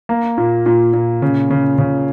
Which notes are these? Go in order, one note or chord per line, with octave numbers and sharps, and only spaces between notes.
A#3
A#2
A#2
A#2
C#3
C#3
C#3